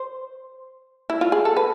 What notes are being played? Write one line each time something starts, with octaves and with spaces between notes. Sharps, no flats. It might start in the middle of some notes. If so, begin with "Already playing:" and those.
Already playing: C5
E4
F4
G#4
A4
B4